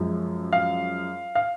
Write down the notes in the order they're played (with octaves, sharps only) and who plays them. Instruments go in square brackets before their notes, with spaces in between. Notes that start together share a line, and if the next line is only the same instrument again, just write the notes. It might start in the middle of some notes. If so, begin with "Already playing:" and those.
Already playing: [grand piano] F#2 F3 G#3
F5
F5